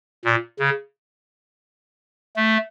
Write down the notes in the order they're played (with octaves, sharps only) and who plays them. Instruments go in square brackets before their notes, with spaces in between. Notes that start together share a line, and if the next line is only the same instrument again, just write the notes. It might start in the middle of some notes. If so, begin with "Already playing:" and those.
[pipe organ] A#2
C#3
A3